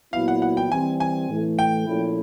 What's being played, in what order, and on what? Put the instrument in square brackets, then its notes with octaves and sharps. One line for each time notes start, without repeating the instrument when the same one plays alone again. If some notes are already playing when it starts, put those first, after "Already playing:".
[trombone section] A#2 F#3 B3 E4 [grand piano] F5
[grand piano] F#5
F#5
G5
[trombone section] E3 G3 C4 [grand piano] G#5
[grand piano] G#5
[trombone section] A2 E3 A3
[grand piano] G5
[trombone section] A#2 F3 A3 C#4 E4